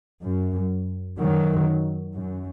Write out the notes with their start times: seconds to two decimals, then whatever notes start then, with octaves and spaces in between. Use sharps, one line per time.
0.23 F#2
1.18 F#2 D#3 F#3
2.14 F#2